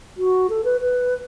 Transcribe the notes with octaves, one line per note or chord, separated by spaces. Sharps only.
F#4
A4
B4
B4